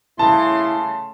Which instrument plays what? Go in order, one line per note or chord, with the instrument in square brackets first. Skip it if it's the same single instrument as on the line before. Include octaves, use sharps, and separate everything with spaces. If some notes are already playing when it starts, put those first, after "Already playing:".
[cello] C#3 A3 [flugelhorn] E4 [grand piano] A5 [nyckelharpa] C6